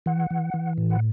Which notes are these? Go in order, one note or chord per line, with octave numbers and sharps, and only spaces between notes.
E3 F#5
E3
E3
A2
F#5